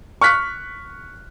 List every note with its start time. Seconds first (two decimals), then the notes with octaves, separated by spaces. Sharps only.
0.21 C#6 F6 F#6 B6